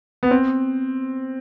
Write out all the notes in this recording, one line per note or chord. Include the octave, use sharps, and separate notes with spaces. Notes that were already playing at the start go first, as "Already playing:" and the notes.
B3
C4